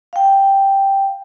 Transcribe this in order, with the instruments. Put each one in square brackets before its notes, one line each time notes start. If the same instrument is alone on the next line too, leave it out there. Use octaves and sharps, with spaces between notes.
[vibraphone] F5 G5